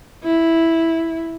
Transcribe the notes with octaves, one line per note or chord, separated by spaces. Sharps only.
E4